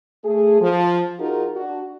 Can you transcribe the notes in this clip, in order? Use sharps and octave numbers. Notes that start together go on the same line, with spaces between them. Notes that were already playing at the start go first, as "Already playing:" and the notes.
A3 G#4
F3
D#4 F4 F#4 G#4 A#4
D4 F#4